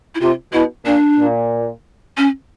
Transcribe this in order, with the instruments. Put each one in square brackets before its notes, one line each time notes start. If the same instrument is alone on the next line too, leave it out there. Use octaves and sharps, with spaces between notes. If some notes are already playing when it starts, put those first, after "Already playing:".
[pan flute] E4
[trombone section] C3 [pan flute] F4
[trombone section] B2 [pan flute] E4
[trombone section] A#2 [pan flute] D4
[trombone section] A#2
[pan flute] C#4